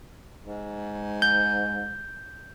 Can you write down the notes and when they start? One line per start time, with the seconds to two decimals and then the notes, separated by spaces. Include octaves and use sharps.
0.45 G#2
1.22 G6